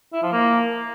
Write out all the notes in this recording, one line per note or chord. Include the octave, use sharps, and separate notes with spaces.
E4
F3
A#3